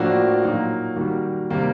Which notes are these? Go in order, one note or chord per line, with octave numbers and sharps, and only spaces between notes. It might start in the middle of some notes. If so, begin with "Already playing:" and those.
Already playing: A2 F3 A#3 D4 F#4
A#2 F#3 A#3 D#4
D#3 G3 A#3 D#4 F#4
C3 D#3 G3 A#3